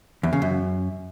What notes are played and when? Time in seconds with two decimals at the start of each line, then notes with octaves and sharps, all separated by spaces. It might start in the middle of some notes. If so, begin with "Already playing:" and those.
0.23 E2
0.33 C#3
0.42 F#2